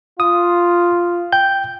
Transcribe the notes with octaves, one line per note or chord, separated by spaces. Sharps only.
F4 D#6
G5 G6